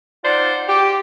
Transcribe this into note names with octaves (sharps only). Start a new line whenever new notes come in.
D#4 F4 C5 D5 F#5
G4